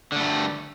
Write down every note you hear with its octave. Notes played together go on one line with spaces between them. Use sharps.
D3 G3 A3